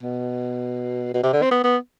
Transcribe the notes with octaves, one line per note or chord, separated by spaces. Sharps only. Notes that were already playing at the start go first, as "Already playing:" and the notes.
B2
B2
C3
D3
C4
B3
B3